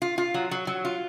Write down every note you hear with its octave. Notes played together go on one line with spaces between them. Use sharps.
F4
F4
F#3
F#3
F#3
F4